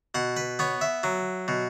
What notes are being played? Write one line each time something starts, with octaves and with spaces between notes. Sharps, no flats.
B2 F#5
B4
B3 C#5
E5
F#3
B2